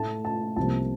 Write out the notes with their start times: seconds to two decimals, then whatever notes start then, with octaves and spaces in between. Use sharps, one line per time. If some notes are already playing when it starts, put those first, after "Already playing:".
Already playing: A2 A3 A5
0.25 A5
0.56 C2 C3 F3 A#3 A5